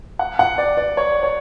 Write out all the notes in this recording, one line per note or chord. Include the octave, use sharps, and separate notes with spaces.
F#5
F#5
D5
D5
C#5
C#5